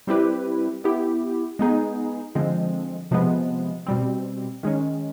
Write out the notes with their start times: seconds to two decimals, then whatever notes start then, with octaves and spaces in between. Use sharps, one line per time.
0.07 G3 C4 E4 G4 B4
0.84 B3 E4 G4
1.59 G#3 B3 D#4 G#4
2.35 D3 F3 G#3 C4
3.11 C3 F3 G#3 B3
3.87 B2 G3 C4
4.63 D#3 G#3 C#4